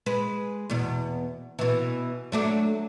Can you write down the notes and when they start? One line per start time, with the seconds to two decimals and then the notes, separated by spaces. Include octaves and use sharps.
0.06 G#3 B4
0.70 E2 B2
1.59 B2 E3
2.32 F#3 A3 D4